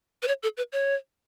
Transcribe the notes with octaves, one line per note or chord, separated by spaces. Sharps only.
B4
C#5
A4
B4
C#5